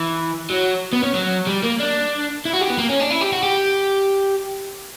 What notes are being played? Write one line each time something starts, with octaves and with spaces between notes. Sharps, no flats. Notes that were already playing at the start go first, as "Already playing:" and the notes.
Already playing: E3
F#3
B3
C#4
F#3
G3
A#3
D4
E4
F#4
G4
B3
A#3
C#4
D4
E4
G4
F#4
G4